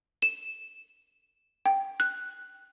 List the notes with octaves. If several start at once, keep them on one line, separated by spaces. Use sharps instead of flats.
E7
G5
F#6